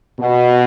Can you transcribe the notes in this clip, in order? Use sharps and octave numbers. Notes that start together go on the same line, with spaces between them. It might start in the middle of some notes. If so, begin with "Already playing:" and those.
B2